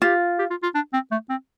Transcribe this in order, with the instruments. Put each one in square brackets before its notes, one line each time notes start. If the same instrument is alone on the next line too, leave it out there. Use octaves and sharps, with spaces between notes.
[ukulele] F4 [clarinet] G4
[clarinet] G4
F4
F4
D4
C4
A3
C4